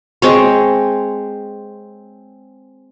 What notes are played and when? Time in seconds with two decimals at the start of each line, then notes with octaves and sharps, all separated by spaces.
0.22 G#3 C4 C#5